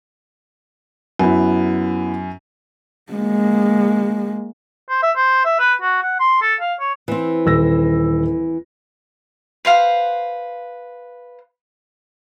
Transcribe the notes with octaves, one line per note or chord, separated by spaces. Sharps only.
F#2 B3 E4
G#3 A#3
C5
E5
C5
E5
B4
F#4
F#5
C6
A4
F5
C#5
E3 C4
D#1 E6 A#6
B4 C5 F5 F#5